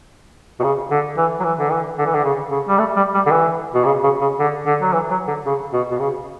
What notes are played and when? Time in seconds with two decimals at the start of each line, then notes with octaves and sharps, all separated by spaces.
0.60 B2
0.64 C#3
0.91 D3
1.17 E3
1.40 F#3
1.45 E3
1.60 D3
1.71 E3
1.99 D3
2.06 E3
2.15 D3
2.24 C#3
2.51 C#3
2.68 G3
2.79 A3
2.96 G3
3.15 G3
3.27 D3
3.31 E3
3.74 B2
3.85 C#3
4.04 C#3
4.21 C#3
4.40 D3
4.66 D3
4.82 F#3
4.93 E3
5.11 F#3
5.28 D3
5.46 C#3
5.73 B2
5.92 B2
6.00 C#3